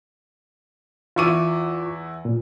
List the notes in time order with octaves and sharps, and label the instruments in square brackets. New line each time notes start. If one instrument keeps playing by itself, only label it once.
[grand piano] E2 E4 D#7 [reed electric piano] F4 C#6 D6
[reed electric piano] A#2